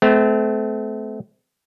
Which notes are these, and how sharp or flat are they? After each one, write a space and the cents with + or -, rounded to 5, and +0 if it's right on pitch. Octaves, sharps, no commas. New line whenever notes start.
A3 -30 C4 -40